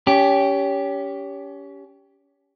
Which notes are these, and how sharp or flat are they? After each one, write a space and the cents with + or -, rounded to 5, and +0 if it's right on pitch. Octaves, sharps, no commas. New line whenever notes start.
C#4 +30 G4 +0